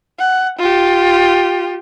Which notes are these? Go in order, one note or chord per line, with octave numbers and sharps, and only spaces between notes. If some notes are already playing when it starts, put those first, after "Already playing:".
F#5
F4 G4